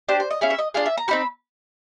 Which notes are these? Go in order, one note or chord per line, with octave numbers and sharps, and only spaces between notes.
D4 G4 C5
C5
D#5
C#4 E4 G#4 F5
E5
D#5
D4 F4 G#4 F5
E5
A#5
C4 D#4 F#4 B5